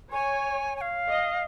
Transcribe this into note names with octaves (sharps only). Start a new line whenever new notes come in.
C#5 G#5
G#5
F5
D#5